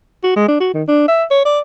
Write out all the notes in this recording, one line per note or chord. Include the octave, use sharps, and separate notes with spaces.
F#4
G#3
D4
F#4
D#3
D4
E5
C#5
D5